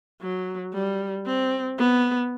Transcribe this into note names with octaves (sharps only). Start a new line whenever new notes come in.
F#3
G3
C4
B3